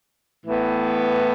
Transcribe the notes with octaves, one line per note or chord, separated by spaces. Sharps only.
A2 E3 B3